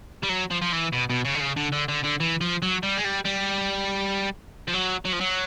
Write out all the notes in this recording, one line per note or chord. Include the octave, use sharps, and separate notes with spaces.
G3
F#3
F3
F3
E3
B2
B2
C#3
D3
C#3
D3
D3
D3
D3
E3
F3
F#3
G3
G#3
G3
G3
F3
F#3
F#3
F3
F#3